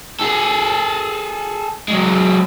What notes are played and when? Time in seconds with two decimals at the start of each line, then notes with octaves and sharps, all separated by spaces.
0.20 G#4 A4
1.88 F#3 G#3